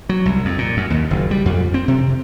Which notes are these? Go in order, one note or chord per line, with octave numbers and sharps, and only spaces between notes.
F#3
C2
F2
A#2
F#2
D#2
F#1
G3
F2
C4
C3